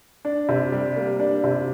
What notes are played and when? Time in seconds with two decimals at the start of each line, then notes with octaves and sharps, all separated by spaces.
0.25 D4
0.49 C3
0.72 G3
0.96 A#3
1.20 D4
1.44 C3